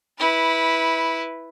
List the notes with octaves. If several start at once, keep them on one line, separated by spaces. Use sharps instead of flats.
E4 B4